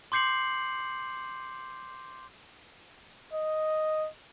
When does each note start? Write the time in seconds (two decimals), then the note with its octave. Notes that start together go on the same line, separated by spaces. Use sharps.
0.12 C6 D6 G6 C7 C#7 F#7
3.34 D#5